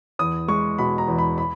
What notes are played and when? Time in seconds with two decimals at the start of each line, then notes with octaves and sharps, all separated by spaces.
0.19 E2 D#6
0.48 G#3 C#6
0.78 B2 B5
0.98 A#5
1.08 E2
1.18 B5
1.38 B5